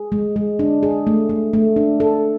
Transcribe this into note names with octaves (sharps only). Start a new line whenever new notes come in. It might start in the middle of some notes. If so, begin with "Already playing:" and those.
Already playing: G#4
G#3
G#3
D4
G#4
A3
A3
A3
D4
A4